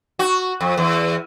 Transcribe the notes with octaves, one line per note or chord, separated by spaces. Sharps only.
F#4
F2
E2